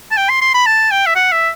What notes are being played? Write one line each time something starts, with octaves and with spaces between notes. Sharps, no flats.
A5
G5
C6
C6
B5
A5
G5
E5
F#5
E5